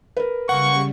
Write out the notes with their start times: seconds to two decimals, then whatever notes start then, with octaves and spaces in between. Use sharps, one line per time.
0.17 A#4 B4
0.49 C#3 G3 A#3 F#5 C#6